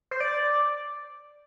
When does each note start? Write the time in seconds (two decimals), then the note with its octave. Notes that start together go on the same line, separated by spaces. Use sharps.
0.11 C5
0.20 D5